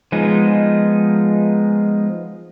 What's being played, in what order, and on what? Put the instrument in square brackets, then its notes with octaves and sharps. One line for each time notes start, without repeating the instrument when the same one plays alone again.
[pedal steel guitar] F3 G#3 B3 D#4 G#4